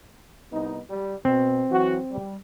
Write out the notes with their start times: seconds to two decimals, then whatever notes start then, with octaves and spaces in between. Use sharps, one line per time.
0.52 C2 B3 D#4
0.89 G3
1.25 B2 C4
1.70 E3 F#3 F#4
2.11 G3